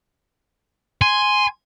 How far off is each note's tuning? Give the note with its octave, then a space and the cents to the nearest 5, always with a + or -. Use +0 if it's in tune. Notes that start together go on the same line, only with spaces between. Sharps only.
G#5 +0 C6 +0